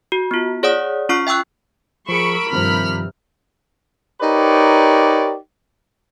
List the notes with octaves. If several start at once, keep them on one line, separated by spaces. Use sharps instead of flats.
F#4
B3 F4
G#4 C#5 D5 F#5 D#6
C#4 F4 C#6 F6 C7
E5 G5 C#6 E6 F#6
F3 G#4 A#4 B5 C#6 E6 D7
G2 C3 D#3 F3 F6
D#4 G4 A#4 B4 C#5 D5